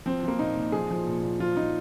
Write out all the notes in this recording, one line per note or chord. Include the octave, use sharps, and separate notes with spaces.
F3 C4
F3 A#3
A#2 D#4
A#2
F3 G#4
F3
A#2
A#2
F3 F4
F3 D#4